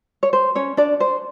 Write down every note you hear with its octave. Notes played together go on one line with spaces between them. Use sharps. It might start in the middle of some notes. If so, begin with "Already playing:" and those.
C#5
C5
C#4 C#5
D4 D5
C5